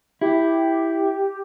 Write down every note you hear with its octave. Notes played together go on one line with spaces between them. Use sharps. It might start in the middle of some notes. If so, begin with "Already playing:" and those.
E4 G4